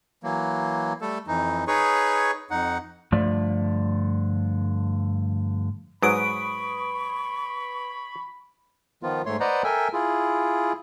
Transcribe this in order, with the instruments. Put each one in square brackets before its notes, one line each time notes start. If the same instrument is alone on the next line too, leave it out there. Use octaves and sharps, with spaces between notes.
[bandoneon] E3 F#3 A#3
G3 A3 A4
F2 E3 D#4
D#4 G#4 B4 C#5 C#6
F2 D#4 F#5
[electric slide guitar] G2 D3 F3 A3 D5
[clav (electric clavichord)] G#2 F#3 [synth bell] B4 D#6 D7 [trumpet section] B5 [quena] C#6
[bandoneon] D#3 F3 B3 F4
G#2 A3 C#5 C6
B4 C5 D5 D#5 F#5 A#5
A4 A#4 E5 G5 G#5
E4 F4 G#4